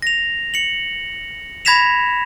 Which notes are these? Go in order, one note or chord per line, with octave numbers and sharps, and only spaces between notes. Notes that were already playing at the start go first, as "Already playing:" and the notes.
A#6 F7
C#7 F#7
B5 G#6 A#6 B6 E7 F7